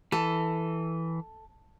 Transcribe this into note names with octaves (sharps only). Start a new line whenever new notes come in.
E3 A4